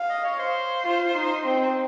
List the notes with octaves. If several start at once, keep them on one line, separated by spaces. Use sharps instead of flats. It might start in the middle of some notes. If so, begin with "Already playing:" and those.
Already playing: F5
D#5
C#5
C5
F4
D#4
C4